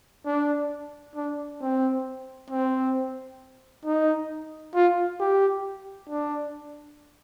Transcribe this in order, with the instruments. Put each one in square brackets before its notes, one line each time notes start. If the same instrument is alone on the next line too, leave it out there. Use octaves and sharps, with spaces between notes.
[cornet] D4
D4
C4
C4
D#4
F4
G4
D4